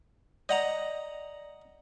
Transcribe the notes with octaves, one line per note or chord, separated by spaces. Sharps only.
D5 D#5 F#5 A#5